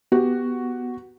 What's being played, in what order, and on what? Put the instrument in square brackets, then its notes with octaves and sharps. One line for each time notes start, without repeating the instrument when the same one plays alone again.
[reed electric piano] B3 [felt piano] F#4 G4